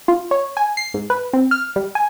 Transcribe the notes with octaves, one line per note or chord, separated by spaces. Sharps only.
F4
C#5
G#5
C7
G#2
B4
C4
F6
G3
G#5